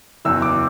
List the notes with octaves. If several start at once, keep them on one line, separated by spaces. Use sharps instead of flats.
F#1 E2 B2 E6
D6